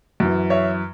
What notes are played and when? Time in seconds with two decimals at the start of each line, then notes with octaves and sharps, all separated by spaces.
0.20 F#2 E3
0.50 C#5 E5